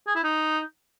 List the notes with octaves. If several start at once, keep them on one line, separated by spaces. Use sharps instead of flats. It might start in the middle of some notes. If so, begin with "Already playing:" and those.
G#4
E4
D#4